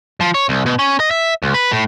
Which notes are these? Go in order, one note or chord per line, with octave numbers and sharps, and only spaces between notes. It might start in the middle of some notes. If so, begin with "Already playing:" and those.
F3
C#5
C2
B2
C#4
D#5
E5
C#2
B4
A2